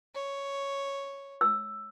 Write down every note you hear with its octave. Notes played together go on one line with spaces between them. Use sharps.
C#5
E6